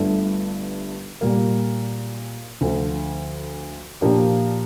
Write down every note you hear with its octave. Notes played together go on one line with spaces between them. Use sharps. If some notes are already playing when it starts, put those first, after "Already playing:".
Already playing: G1 G2 D3 A3
A#2 G3 A#3
D2 D3 F3
A#2 F3 A#3 D4 G4